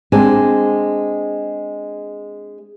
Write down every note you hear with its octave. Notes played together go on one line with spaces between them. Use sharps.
G#3 C4 D4